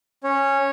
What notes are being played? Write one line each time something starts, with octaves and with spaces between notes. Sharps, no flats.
C#4 C#5